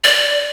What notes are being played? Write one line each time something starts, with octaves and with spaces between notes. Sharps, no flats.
D5